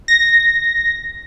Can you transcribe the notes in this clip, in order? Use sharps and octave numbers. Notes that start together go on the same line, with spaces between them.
A#6